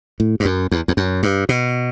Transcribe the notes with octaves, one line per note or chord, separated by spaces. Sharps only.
A2
G2
F#2
E2
E2
F#2
G2
B2